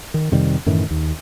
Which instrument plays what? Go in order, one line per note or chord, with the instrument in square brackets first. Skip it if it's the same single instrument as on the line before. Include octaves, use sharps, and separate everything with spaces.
[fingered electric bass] D#3
F2 C3 D#3 G3
F#2 A2 D#3 E3
D#2